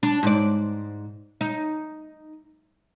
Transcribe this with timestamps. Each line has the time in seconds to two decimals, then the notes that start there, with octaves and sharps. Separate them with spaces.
0.03 D4
0.23 G#2 D5
1.41 D#4